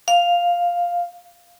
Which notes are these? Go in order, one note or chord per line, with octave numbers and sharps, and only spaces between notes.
F5